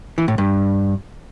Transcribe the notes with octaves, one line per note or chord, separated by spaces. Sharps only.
E3
A2
G2